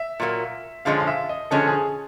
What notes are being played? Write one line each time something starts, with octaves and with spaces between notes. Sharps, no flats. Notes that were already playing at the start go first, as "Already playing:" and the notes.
Already playing: E5
A#2 F#3 A#3
D3 F3 G#3 C#4 F5
F5
E5
D#5
D3 F3 G#3 C#4 A4
G#4